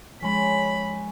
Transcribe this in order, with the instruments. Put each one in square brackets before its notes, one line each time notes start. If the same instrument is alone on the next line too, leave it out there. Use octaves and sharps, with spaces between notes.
[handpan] F3 G#3 [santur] C#4 C5 [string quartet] B5